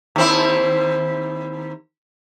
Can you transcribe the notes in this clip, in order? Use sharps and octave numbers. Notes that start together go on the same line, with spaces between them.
D#2 C4 E4